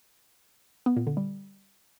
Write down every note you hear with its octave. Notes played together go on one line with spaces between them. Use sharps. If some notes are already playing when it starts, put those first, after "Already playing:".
B3
A#2
D3
G3